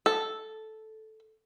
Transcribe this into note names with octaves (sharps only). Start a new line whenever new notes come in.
A4